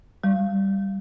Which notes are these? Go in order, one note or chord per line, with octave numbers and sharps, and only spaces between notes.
G3